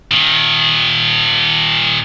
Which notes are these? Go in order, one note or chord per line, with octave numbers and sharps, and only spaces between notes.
A#2 D#3